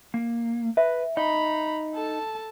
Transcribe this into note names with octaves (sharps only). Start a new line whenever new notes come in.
A#3
B4 E5
D#4 D#5 A#5 B5
A4 A5